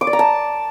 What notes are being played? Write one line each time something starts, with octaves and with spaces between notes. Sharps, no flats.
D6
D5
A#5
A5